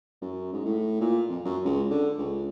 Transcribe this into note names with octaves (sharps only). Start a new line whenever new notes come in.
F#2
G#2
A2
A#2
F2
F#2
C#2
D3
C#2